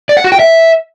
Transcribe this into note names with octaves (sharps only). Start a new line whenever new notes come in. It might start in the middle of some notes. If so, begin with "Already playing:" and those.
D5
F#5
F#4
G5
E5